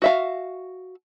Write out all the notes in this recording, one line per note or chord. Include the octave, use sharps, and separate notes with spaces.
F#4 E5 F5